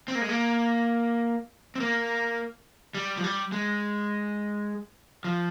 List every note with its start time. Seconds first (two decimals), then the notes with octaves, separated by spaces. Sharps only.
0.08 C4
0.15 A#3
0.22 G#3
0.29 A#3
1.75 C4
1.80 A#3
2.95 G3
3.17 F3
3.24 G3
3.52 G#3
5.24 F3